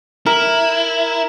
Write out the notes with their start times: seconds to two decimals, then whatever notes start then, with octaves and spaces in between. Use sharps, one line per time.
0.26 E4 A#4